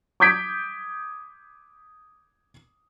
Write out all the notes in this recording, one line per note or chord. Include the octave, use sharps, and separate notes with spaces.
D6 D#6 G6 G#6 B6 D7